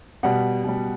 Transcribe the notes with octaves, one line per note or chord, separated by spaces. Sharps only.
B2 G3 F#5
B2 G3